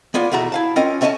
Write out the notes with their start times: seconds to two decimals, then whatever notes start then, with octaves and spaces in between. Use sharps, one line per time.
0.14 A#3 B3 F4 D5
0.32 E2 B2 A3 F#4 A#5
0.52 E4 F5 A5
0.76 C4 C#4 F4 A#4 D#5
1.01 A3 C#4 D#5 E5 G#5 A5